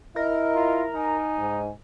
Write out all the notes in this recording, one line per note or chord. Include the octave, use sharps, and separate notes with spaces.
E4 A#4 D#5
F4
D#4 G#5
G#2